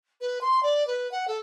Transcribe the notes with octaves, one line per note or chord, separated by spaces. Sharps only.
B4
C6
D5
B4
F#5
A4